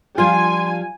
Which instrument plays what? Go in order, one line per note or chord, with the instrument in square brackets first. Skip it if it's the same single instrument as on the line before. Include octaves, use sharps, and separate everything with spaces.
[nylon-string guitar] F3 G3 D4 [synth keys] F4 [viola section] G#5 [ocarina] C6